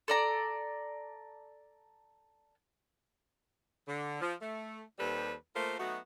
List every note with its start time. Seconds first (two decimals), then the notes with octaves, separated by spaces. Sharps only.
0.08 A4 D5 A#5
3.88 D3
4.21 F3
4.42 A3
4.99 D#2 G3 C4 A4 B4
5.55 A3 A#3 F4 A#4 C5
5.80 F#3 A3 B3 D#4 F#4